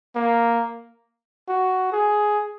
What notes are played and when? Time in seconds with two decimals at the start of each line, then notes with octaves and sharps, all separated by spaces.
0.15 A#3
1.48 F#4
1.92 G#4